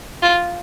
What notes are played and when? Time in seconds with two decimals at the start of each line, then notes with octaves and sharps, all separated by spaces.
0.22 F4